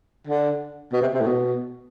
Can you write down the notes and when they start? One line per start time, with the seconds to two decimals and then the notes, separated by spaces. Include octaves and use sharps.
0.27 D3
0.93 B2
1.02 C3
1.14 C3
1.21 A2
1.27 B2